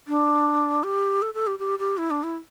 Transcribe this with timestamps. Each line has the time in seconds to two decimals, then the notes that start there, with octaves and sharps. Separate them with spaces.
0.08 D4
0.83 G4
1.22 A4
1.34 A4
1.47 G4
1.59 G4
1.79 G4
1.98 E4
2.11 D4
2.23 E4